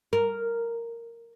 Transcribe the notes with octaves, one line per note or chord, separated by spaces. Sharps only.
A#4